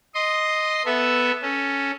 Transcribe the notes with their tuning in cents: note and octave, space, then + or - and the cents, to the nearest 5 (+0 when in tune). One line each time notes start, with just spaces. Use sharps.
D#5 +0 C6 +0 D#6 -20
B3 +0 A4 +0 E5 +0
C#4 +0 A4 +0